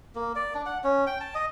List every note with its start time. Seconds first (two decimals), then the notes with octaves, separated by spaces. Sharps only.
0.15 A#3
0.36 D5
0.54 D4
0.66 F#5
0.84 C#4
1.07 G5
1.20 A5
1.35 D#5